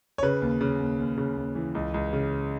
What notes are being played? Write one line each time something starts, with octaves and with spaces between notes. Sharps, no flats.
C#5
C#3 B4
D#2
C#3
D#2
D#2
C#3
D#2
E3
C#2
C#2
C#3